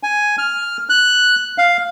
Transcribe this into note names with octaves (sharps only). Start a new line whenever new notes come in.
G#5
F6
F#6
F5